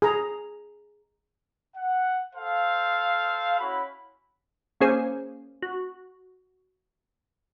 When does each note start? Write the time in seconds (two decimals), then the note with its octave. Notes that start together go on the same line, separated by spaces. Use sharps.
0.02 G#4 A#5
1.75 F#5
2.34 A4 C5 F5
3.60 C#4 E4 F#4 B5
4.80 A#3 C#4 G#4 C5 G#5
5.62 F#4